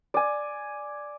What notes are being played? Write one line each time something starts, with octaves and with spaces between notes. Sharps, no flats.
D5 G#5